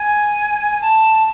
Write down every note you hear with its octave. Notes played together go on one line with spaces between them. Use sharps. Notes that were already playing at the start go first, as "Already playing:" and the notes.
Already playing: G#5
A5